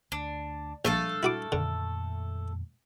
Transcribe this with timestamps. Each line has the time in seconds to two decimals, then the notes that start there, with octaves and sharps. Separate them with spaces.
0.12 D2 D4
0.85 A#1 G3 A3 D4 A4 F5
1.23 E4 F#4 D6
1.52 F2 A#2 D3 D#3